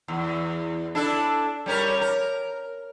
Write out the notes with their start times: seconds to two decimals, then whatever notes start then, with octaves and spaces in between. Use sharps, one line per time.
0.08 E2
0.95 D4 E4 A4
1.66 G3 C#4 A#4
2.01 A#4